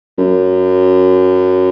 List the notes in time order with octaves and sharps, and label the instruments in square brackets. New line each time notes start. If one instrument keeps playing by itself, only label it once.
[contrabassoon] F#2